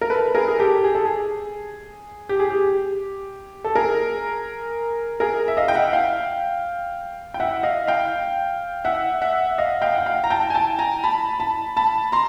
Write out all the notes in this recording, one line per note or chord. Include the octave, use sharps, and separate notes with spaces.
A#4
A4 B4
G#4 A#4
G#4
G4 A4
G#4
A4
G#4
G4
G#4
G4
A4
G#4 A#4
G#4 A#4
E5
D#5 F5
G5
E5 F#5
F5 G5
G5
E5 F#5
D#5 F5
F5 G5
E5 F#5
E5 F#5
D#5 F5
F5 G5
F#5
F5 G5
A#5
G5 A5
G#5
G5 A5
G#5 A#5
A5 B5
A5 B5
A5 B5
A#5 C6